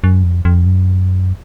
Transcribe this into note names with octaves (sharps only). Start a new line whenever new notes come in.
F#2
F2
F2
F#2